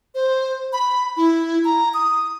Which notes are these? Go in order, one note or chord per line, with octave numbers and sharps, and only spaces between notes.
C5
B5
E4
A#5
D#6